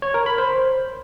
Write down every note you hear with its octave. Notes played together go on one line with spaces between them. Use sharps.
C#5
A#4
B5
C5